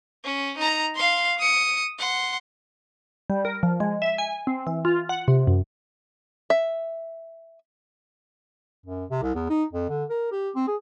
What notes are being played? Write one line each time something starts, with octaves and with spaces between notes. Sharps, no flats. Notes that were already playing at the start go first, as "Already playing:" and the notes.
C#4
D#4 A#5
F5 C6
D#6 C#7
F#5 C6
G3
A#4
F3
G#3
E5
G#5
C4
E3
F4
F#5
C3
F#2
E5
F#2
C3
C2
E2
D#4
F2
D3
A#4
G4
C4
G#4